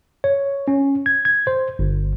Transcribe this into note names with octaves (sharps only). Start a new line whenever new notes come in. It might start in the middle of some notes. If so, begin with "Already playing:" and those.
C#5
C#4
G#6
G#6
C5
G1